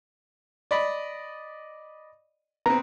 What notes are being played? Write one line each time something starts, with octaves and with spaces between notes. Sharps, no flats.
D5 D#5 B5
B3 C4 A#5